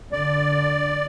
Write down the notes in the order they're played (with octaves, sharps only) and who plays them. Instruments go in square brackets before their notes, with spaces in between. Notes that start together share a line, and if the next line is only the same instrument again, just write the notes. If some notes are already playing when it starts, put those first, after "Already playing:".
[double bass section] D3 [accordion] D5